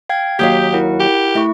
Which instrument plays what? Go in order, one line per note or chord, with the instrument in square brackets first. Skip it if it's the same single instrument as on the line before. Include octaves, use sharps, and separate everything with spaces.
[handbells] F5 G5 G#6
[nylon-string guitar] D#2 F#3 F5 [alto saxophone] G4 [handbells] D#6 G6 B6
[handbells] E4 A#4 F#5
[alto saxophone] G4
[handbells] A3 E4 C#6 [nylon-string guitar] E5